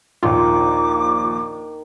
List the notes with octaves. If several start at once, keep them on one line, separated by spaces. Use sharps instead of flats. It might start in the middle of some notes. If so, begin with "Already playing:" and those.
A#1 D#2 D#3 F4 D6